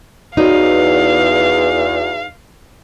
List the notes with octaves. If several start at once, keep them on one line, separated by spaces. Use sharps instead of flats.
E2 D#4 F#4 C#5 D5 F5